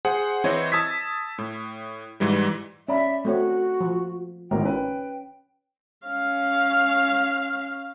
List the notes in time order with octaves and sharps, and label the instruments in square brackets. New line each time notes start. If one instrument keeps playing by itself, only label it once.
[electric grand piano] G#4 C5 F#5
E3 C4 E4 C5 C#5 D#5
A5 D#6 E6 G#6 B6
A2
G#2 E3 G3
[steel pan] C#4 [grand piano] D5 B5 [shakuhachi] E5
[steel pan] A3 C4 C#5 [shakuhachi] F#4
[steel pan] F3
[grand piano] G#1 A2 A#4 [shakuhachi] G5
[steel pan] C#4 [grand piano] B4
[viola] C#4 F5